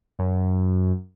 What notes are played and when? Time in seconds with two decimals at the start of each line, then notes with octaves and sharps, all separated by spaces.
0.19 F#2